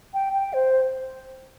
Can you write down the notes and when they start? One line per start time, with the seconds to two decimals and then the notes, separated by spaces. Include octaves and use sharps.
0.14 G5
0.33 G5
0.53 C5